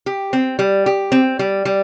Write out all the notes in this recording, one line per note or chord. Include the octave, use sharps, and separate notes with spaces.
G4
C4
G3
G4
C4
G3
G3